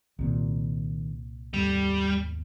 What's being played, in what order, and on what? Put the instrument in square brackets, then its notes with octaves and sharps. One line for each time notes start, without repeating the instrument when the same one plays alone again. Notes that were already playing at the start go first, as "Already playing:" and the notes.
[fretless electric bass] C2 A#2 [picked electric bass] D#3
[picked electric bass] D#2 G#2 A3 [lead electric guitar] G3